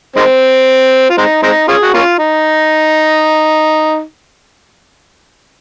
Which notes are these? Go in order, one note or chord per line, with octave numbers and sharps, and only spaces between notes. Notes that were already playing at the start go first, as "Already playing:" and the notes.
D#3 G#3 C4
F4
G#3 C4 D#4
G#3 C4 D#4
C#4 F4 G#4
F#4
A#3 C#4 F4
D#4